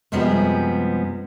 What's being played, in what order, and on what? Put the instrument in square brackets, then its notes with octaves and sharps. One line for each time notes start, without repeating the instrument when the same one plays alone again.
[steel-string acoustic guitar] F#2 C3 F3 G3 G#3 B3